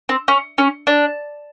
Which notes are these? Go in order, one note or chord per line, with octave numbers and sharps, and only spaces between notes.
C4
C#4
C#4
D4